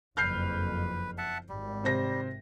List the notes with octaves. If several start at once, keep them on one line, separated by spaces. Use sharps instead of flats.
F#1 F2 B4 F6 G6 C7
E5 F#5 A5
G#1 G3
C3 C5 A#6